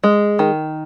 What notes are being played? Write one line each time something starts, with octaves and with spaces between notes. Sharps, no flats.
G#3
D#3